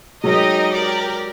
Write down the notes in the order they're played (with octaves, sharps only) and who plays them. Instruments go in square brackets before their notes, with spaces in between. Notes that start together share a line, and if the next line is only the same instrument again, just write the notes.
[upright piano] F#3 G#3 [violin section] D#4 G4 A#4 D#5
[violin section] G4 A#4 D5